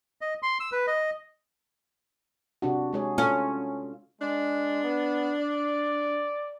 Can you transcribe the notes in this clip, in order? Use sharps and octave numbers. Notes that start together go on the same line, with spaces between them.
D#5
C6
E6
B4
D#5
C3 D4 F#4
G#3 G#4 C#5
C#4 F4 A4
G#3 D4
B3
D5